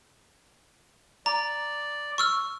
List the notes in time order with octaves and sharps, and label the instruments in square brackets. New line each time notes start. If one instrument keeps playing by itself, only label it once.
[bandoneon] D5 [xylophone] A#5
[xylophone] C#6 E6 F6